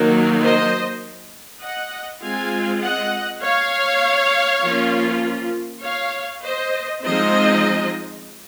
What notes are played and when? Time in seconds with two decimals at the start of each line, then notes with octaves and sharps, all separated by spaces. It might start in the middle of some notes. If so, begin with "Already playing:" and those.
Already playing: D#3 F#3 A#3 D#4
0.42 C5 D#5
1.63 D#5 F#5
2.22 G#3 C4 F4 F5 G#5
2.82 D#5 F#5
3.42 C#5 F5
4.63 F3 A#3 C#4 F4
5.83 C#5 F5
6.43 C5 D#5
7.04 F3 G#3 C4 D#4 C5 D#5